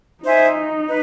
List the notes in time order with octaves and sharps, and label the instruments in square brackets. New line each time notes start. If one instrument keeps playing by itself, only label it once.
[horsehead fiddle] D#4 [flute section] C5 E5 G#5
[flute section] B4